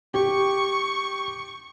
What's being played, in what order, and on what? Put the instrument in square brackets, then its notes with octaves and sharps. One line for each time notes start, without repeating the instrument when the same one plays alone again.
[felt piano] G4 [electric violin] C#6